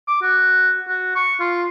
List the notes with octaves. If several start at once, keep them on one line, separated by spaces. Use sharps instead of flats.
D6
F#4
F#4
C#6
F4